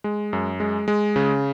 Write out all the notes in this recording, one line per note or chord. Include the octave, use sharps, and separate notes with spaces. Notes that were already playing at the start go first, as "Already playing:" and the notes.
G#3
F#2
G#3
G#3
C#3